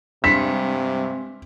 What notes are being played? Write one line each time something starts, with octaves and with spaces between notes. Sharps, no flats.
G2 C3 G#3 C4 B6